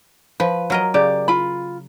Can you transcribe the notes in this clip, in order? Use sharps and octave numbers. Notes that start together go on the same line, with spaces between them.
F3 B4
F#3 A#4 D#5
C#3 G4 D5
F4 B5